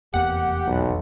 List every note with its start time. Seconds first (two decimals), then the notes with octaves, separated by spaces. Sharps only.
0.14 F1 E2 A#3 G4 F#5
0.67 B1